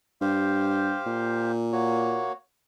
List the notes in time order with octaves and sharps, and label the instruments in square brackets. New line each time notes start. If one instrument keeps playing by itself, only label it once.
[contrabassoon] G2 [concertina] G4 C5 F5
[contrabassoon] A#2
[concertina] A#3 F#4 C#5